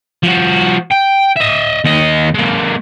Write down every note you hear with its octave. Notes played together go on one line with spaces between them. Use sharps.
F3 F#4
G5
D#5 E5
D#2 D#5
G#3 A#3